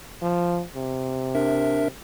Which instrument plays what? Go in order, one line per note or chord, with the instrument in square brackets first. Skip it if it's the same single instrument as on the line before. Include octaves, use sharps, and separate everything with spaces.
[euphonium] F3
C3
[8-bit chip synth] D4 A#4 E5